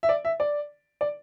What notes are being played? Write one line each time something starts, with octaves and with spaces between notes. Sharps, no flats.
E5
D5
E5
D5
D5